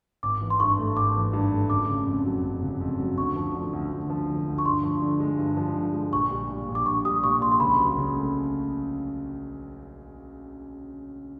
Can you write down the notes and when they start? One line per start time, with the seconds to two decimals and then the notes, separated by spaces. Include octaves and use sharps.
0.23 G#1 D6
0.41 E3
0.50 C6
0.60 G2 C#6
0.78 A3
0.96 G#1 D6
1.15 E3
1.33 G2
1.52 A3
1.70 F#1 D6
1.89 C#3
2.07 F2
2.26 F#3
2.44 F#1
2.62 C#3
2.81 F2
2.99 F#3
3.17 D2 C#6
3.36 F3
3.55 D3
3.73 D2
3.91 D2
4.10 F3
4.29 D3
4.47 D2
4.58 C#6
4.65 G2 C6
4.83 F3
5.02 D3
5.20 G#3
5.39 G2
5.57 F3
5.75 D3
5.94 G#3
6.13 A#1 C#6
6.31 G3
6.49 A#2
6.69 A#1
6.75 D6
6.86 A#1 C#6
7.05 G3 D#6
7.23 A#2 C#6
7.41 A#1 C6
7.52 C6
7.60 C#2 B5
7.79 F#3
7.97 C#3
8.16 A3